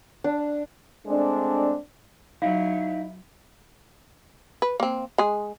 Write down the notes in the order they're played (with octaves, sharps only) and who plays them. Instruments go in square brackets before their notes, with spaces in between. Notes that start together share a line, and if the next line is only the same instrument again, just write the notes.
[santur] D4
[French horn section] G#3 A3 C4 D4
[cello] F#3 [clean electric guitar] D#4 E4 [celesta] F5
[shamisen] B4
A#3 C4
G#3 G#4